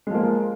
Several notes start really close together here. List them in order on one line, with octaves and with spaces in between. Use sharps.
G#3 F3 A#3